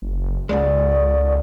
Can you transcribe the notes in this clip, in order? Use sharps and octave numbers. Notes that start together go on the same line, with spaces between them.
F#1
C#2 G#2 C#3 G#3 D5